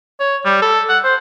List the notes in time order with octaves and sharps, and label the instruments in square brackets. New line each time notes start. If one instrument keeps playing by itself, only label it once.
[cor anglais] C#5
G3
A4
F#5
C5